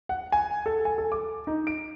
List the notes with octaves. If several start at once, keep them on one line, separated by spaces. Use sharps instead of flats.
F#5
G#5
A4
G#5
A4
D6
D#4
D7